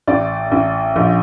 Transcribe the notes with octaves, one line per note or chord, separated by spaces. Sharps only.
A1 D5
A1
A#1